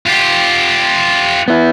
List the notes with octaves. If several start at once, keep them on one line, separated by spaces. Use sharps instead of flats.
F4 G4
B3 E4